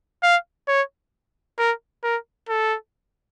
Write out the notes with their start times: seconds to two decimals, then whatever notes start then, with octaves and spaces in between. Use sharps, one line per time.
0.23 F5
0.68 C#5
1.58 A#4
2.03 A#4
2.49 A4